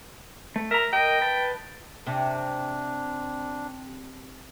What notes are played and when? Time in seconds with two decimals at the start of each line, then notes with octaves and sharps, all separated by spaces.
0.56 A3
0.71 A#4 E5 A#5
0.93 A#4 D#5 G5
1.21 B4 A5
2.07 C3 D4